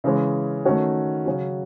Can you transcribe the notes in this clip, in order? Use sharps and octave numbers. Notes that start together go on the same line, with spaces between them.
C#3 E3 G#3 C#4
D#3 A3 C#4 F#4
C#3 F#3 C#4 F#4